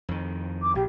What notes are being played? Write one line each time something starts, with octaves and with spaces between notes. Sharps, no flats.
F2 D#3
D6
A#1 G4